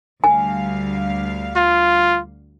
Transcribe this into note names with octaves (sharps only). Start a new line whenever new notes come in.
D2 G3 F5 G#5
F4